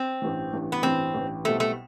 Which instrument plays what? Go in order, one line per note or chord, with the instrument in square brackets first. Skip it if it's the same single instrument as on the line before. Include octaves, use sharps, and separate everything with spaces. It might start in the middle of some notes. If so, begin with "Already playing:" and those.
Already playing: [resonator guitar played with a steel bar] C4
[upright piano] A1 G2 E3
A1 G2 E3
[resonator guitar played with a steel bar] B3
[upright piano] A1 G2 E3 [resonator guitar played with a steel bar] C4
[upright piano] A1 G2 E3
[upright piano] B1 B2 G3 C4 E4 [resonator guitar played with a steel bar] A3
[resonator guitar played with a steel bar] A3